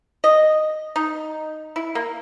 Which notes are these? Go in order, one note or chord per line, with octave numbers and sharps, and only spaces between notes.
D#5
D#4
E4
A#3